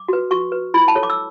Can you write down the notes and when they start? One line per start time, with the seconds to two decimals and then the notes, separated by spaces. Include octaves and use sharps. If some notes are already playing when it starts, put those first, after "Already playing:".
Already playing: D6
0.08 F#4 B4
0.31 F#4 C#6
0.52 B4
0.74 E4 B5
0.88 A5
0.95 A4 C#5
1.03 D6
1.10 E6